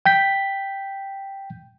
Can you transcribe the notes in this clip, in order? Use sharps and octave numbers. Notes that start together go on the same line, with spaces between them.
G5 G6 B6